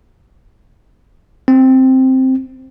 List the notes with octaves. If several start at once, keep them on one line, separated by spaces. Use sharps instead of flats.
C4